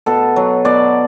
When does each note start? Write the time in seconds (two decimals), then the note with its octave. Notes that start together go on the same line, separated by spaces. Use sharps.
0.06 B2 A4
0.36 F#3
0.65 B2 D5